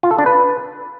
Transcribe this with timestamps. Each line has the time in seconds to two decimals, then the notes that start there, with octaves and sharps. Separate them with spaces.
0.03 F4
0.11 A4
0.18 D4
0.26 B4